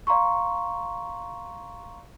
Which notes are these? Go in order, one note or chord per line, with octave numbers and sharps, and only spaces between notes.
D5 F5 A#5 C6 C#6